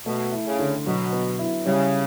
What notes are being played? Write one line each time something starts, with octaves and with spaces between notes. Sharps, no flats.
B2 A3
E4
C#3
D3
B2 F#3
B3
E4
C#3 G3